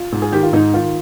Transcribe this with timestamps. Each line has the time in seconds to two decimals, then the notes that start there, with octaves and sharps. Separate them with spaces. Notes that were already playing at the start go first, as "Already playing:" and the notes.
Already playing: F4
0.12 G#2
0.22 G#4
0.32 D#3 G4
0.43 F4
0.53 G#2 D#4
0.73 D#3 F4